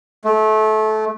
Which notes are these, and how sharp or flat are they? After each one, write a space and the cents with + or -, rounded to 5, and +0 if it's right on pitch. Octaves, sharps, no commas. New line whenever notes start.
A3 -25